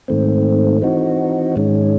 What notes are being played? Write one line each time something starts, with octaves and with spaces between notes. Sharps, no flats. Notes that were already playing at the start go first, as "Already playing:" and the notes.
G#2 D#3 A3 C4
E3 C4 D#4 F#4
G#2 D#3 G#3 C#4